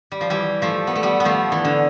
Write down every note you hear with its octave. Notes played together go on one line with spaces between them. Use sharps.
G3
F3
E3 G3
F3 A3
B3
A3
G3 B3
B3
F3 A3
E3
D3